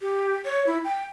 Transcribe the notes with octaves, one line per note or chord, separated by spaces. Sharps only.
G4
C#5
E4
G5